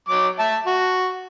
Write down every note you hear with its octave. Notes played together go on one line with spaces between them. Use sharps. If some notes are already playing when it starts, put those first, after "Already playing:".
F#3 D6
E5 A5
F#4